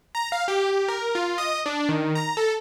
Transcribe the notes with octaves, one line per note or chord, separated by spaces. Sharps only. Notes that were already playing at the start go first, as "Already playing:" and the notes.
A#5
F5
G4
G4
A#4
F4
D#5
D4
D#3
A#5
A4